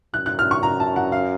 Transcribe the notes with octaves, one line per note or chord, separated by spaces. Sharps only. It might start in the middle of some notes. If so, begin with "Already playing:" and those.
F#2 F#6
F#6
F6
C#6
A#5
A5
F#5
F5